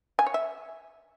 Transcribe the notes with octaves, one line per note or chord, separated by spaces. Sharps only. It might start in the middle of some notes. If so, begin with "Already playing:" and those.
G#5
C#5
E5